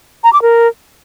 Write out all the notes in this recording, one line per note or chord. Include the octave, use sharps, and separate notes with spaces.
A#5
D6
A#4